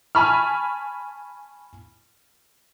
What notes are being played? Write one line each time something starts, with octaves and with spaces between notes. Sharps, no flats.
G#5 A5 B5 C#6 F6